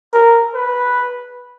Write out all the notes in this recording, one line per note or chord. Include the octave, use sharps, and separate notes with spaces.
A#4
B4